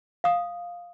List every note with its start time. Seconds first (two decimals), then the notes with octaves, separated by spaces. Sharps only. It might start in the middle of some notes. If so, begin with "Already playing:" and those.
0.24 F5 D#6